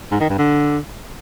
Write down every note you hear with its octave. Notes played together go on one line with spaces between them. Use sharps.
G#2
D#3
G2
D3